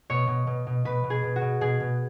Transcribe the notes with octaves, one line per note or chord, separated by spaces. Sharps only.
B2 C#5
B2
B2
B2
B2 B4
B2
G#4
B2
F#4
B2
B2 G#4
B2